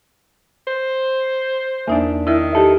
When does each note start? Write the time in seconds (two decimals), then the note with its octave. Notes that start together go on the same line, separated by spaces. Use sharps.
0.67 C5
1.88 E2 A#3 D4 D#4 E5
2.27 D#3 E4 A#4
2.55 D#4 G4 A4